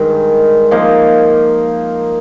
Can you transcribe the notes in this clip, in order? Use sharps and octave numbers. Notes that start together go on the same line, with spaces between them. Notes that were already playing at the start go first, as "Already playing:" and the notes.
Already playing: G2 D#3 G#3
F3 A#3 D#4